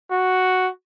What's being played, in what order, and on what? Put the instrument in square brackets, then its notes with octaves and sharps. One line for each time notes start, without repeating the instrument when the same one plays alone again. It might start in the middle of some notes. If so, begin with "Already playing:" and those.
[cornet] F#4